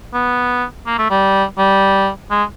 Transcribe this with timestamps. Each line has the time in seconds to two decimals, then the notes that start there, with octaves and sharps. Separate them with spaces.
0.14 B3
0.86 A#3
0.98 A3
1.10 G3
1.58 G3
2.30 G#3